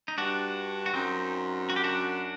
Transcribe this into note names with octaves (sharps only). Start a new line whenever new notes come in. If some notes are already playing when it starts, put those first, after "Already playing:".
D#4
G2 D4 F#4
F#4
F#2 C4 D#4
F#4
G4
D4 F#4